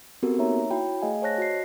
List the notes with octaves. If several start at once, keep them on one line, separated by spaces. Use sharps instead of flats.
B3 C4 F#4 G4 A4 A#4
A#3 D#4 C#5 E5 A#5
E4 F#4 C#5 G5 B5
A3 G#4 D#5 F5 G#5
C5 C#5 A5 F#6 A#6
F#4 D#5 C7